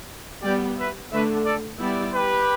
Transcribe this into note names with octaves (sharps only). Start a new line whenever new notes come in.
G3 B3 G4 D5 G5
B4 E5
D3 A3 D4 B4 E5
A4 D5
G3 B3 E4 G4 D5
G4 B4